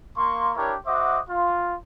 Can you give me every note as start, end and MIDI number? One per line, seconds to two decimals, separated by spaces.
0.16 0.52 58
0.16 0.52 84
0.16 0.52 85
0.55 0.75 62
0.55 0.75 64
0.55 0.75 67
0.55 0.75 70
0.55 0.75 73
0.87 1.18 66
0.87 1.18 72
0.87 1.18 75
0.87 1.18 76
0.87 1.18 78
0.87 1.18 86
1.29 1.75 65